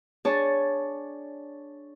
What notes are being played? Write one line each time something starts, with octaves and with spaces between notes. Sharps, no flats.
D4 G#4 C#5 A5